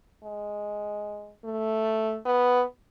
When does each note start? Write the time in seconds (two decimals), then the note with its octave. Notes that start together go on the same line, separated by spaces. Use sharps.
0.24 G#3
1.45 A3
2.26 B3